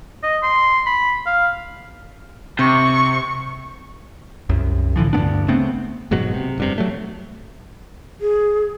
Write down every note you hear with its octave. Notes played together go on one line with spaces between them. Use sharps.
D#5
C6
B5
F5
C3 C#6
C2 F#2
A2 D3 E3 F3
D2 G2 B3 D4
C#3 A3 B3 C4
F#1 G#2 B2 F#3
C3
F1 G2 C3
F#3 A3
G#4